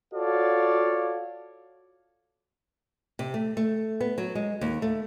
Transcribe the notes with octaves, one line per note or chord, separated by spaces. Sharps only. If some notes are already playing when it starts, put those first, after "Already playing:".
F4 F#4 A4 C#5 D5 F5
C3
A3
A3
B3
F#3
G#3
D#2
A3